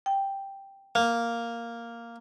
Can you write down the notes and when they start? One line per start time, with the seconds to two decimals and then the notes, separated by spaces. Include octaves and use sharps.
0.06 G5
0.95 A#3